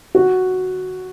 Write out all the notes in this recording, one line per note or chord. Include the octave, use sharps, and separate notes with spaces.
F#4